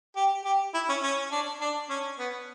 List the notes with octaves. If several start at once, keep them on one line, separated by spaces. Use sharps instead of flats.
G4
G4
E4
C#4
C#4
D4
D4
C#4
B3